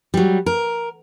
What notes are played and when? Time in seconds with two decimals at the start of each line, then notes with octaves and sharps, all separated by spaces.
0.14 F#3 G3
0.46 A#4